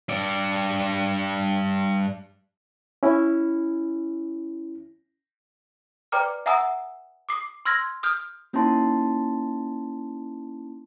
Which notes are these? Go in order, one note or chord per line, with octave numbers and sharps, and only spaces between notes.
G2 D5
C#4 E4
B4 D5 G5 A#5 D6 F6
E5 F#5 G#5 A#5 D#6 E6
D6 D#6 C7
C6 E6 F6 G#6 A#6
D#6 F6 G6
A#3 C#4 D#4 E4 A5 C6